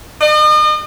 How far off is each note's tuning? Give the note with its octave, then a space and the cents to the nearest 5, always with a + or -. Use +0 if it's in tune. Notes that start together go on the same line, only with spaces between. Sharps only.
D#5 -40